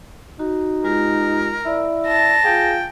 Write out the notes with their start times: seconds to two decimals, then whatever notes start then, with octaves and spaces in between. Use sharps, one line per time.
0.39 D#4 F#4
0.84 G#3 F4 G4 A#4
1.65 E4 D5 E6
2.07 A5 A#6
2.45 F4 G#4 F5 G5